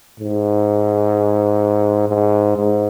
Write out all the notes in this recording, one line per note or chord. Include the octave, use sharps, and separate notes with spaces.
G#2
G#2
G#2